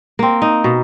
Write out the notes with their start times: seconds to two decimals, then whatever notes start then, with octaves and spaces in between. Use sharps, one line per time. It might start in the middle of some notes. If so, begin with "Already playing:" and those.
0.19 A#3 C4
0.42 D#4
0.64 B2